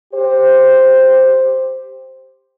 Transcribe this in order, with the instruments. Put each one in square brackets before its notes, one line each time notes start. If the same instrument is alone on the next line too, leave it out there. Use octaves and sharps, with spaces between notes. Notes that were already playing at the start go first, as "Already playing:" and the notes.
[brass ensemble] G4 C5